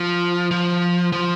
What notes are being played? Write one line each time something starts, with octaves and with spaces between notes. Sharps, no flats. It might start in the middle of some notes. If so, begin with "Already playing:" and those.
Already playing: F3
F3
F3